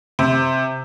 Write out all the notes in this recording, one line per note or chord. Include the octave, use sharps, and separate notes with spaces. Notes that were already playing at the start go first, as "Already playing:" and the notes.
C3